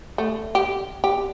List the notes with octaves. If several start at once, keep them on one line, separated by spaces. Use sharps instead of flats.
A3
G4
G4